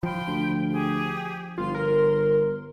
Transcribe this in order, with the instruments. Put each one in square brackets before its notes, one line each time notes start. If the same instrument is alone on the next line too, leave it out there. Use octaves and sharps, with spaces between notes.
[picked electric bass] F3 [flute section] G5 B5 C6
[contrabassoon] D2
[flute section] G4 G#4
[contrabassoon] G1 [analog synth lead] F4 [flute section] C6
[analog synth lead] A#4